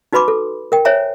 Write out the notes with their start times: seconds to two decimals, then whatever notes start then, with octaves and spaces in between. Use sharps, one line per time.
0.13 D#4 F#4 B4 B5 C6 D6
0.28 A4
0.72 A#4 G5
0.85 C5 C#5 E5 G#5 A#5